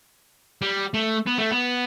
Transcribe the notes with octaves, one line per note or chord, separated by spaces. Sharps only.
G3
A3
B3
A3
B3